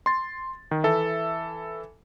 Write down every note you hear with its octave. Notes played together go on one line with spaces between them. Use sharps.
C6 A6
D#3
E3 A4 E5